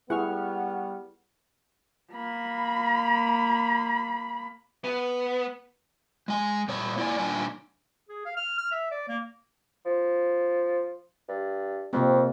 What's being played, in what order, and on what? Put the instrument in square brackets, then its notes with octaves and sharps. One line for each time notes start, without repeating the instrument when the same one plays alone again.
[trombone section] G3 B3 [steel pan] E4 G#4 [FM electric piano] F#5 C#6 F6
[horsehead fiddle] A#3 B5
[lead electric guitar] B3
[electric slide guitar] G#3 G#5
A#2 G3 C#5
A#3 E4 B4 D5 G#5
A#2 D#3 G3 D4 G#5
[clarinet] G#4
F5
F6
F6
E5
D5
A#3
[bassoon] F3
G2
[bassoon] F2 [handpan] C3 A#3 C4